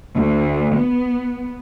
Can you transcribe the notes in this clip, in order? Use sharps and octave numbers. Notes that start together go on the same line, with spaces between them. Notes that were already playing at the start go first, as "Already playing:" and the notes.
D2
B3